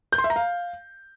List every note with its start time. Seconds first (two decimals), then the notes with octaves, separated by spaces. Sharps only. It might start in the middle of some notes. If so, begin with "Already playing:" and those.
0.12 G6
0.18 C6
0.24 E5
0.30 A#5
0.36 F5